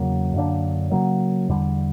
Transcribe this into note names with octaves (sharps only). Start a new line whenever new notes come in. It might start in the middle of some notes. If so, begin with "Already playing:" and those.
Already playing: E2 C#3 F#3 A#3
F#2 D3 A#3 D4
C#3 F#3 A#3
E2 D3 G3